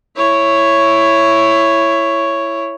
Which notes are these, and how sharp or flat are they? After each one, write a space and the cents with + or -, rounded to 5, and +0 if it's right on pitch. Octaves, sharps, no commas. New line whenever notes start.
E4 +15 C#5 +0